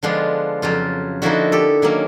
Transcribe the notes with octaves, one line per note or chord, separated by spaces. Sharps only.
D3 F3 G#3 B3 D4 F4
F2 C#3 F#3 F4
D3 F3 A#3 D#4 E4 F#4
G4 A4
D#3 F#3 A#3 C#4